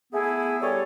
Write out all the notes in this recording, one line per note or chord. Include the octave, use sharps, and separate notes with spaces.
A3 B3 E4 G#4
G3 A4 C#5